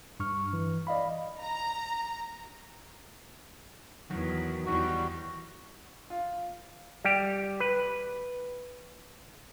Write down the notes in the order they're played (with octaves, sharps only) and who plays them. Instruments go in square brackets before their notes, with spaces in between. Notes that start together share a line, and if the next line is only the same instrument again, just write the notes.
[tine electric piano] G2 C#6 F6
E3
D5 D#5 F5 B5
[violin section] A#5
[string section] E2 [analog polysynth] D#3 F#3
[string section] E2 G3 [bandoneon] F#4
[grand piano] F4
[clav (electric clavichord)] G3 G4
B4